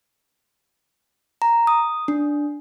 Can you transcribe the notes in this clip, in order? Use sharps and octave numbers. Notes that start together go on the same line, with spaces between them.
A#5
D#6
D4